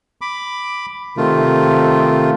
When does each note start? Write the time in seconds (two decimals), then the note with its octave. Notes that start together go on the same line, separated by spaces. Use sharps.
0.21 B5 D6
1.17 C3 D#3 A3 F4